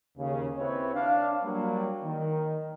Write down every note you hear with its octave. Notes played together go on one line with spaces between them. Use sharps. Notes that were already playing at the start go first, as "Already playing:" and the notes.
D#2 C#3
C4 E4 B4 C#5
D4 F5
F#3 G3 A#3
D#3